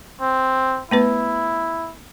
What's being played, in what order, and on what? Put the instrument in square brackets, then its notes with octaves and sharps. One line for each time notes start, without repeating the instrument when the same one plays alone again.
[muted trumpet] C4
[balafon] A3 B3 B4 [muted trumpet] E4